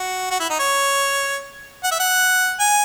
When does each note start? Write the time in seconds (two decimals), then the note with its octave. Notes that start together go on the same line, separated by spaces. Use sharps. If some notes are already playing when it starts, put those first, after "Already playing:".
Already playing: F#4
0.30 F#4
0.40 E4
0.50 D#4
0.59 C#5
1.83 F#5
1.91 E5
2.00 F#5
2.60 G#5